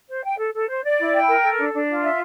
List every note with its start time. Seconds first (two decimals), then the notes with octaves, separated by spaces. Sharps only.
0.09 C5
0.24 G5
0.39 A4
0.54 A4
0.68 C5
0.84 D5
0.99 E4
1.14 G5
1.28 A#4
1.44 A4
1.58 D4
1.74 D4
1.89 F4
2.03 E5